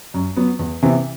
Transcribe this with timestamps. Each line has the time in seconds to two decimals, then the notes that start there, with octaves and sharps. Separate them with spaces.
0.14 F#2
0.37 F#3 B3
0.59 E2
0.83 C3 E3 B3